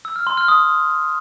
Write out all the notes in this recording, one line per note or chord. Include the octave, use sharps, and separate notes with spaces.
E6
F6
C6
F6
D#6